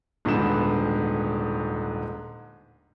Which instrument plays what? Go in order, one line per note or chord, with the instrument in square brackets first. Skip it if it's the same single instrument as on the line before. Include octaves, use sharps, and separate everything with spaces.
[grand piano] D#1 G#2 D3 G#3 B3 E7